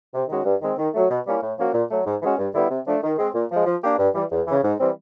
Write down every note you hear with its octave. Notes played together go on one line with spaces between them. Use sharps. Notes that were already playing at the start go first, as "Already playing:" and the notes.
C3
D#3 G#3 C#4 F#4
G2
D#3 G#3 C4
D#3
F#3 A3
B2
G3 A#3 C#4 E4
A2
F3 A#3 C#4 F#4
A#2
F#3 A3
G#2
E3 G#3 C#4 F#4
G2
D3 G3 B3 E4
C3
F3 A3 D4
D#3
G#3 C4
A#2
F3 G#3
F3
A#3 D4 G4
G2
E3 G3
E2
C#3 E3
G#2
E3 G3 C4